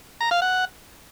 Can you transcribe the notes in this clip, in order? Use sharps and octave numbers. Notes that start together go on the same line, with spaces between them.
A#5
F5
F#5